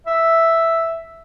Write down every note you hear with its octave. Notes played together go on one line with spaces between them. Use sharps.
E5